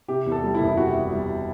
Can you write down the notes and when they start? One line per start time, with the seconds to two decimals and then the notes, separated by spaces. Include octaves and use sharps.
0.08 C3 G4
0.26 E2
0.32 A4
0.43 G3
0.55 E4
0.60 F#1
0.77 C3 F#4
0.95 E2
1.12 G3